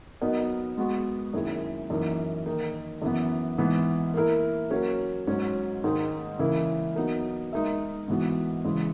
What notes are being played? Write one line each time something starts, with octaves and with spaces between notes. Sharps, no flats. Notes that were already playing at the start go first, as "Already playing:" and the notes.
F#3 B3 D#4 A#4 D#5
G#3 B3 F#4
F#2 D#3 A#3 E4 G#4
F#2 E3 A#3 D#4
D#3 A#3 D#4
F#2 E3 B3
G#2 E3 B3
A#3 E4 A#4
F#3 A#3 C#4
G#2 F#3 C#4
G#2 D#3 G#3 D#4
C#3 E3 A#3 E4 A#4
F#3 B3 D#4 A#4
G#3 D#4 A#4 E5
G#2 E3 B3 F#4
C#3 E3 G#3